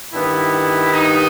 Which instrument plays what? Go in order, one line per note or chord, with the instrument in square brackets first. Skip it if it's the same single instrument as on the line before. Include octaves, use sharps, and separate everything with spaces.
[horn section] G2 D#3 G3 B3 E4
D#4